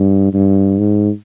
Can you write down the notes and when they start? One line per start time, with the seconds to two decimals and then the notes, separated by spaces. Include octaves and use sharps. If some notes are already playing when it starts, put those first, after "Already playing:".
Already playing: G2
0.33 G2
0.78 G#2